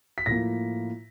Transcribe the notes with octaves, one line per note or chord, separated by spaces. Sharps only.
B6
A2 F3 A#3 A#6